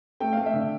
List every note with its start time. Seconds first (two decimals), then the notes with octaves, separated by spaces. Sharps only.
0.20 A3 G5
0.33 A3 F5
0.46 E5
0.54 D3